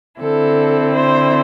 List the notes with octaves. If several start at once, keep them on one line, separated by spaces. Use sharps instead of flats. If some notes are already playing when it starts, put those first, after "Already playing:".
D3 C4 E4 A4
C5